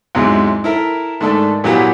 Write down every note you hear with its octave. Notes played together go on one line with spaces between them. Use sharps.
E2 G#2 C3 F#3 G#3
E4 A4 A#4 E5
G#2 D#3 A3 D4 A4 D5
A#2 E3 F#3 A#3 B3 G4